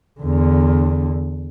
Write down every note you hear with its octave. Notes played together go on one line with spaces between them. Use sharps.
E2 D3